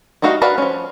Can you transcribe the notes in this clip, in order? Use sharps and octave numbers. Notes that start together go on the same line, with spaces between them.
G3 A3 D#4 F#4 F5
F#4 A#4 B4 D5 F5
F3 C#4